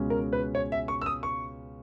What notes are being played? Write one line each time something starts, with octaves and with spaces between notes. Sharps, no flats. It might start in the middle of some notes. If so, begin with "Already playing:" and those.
Already playing: C#2 B2 G#3 C#4
A#4
B4
C#5
E5
C#6
E6
D#6
C#6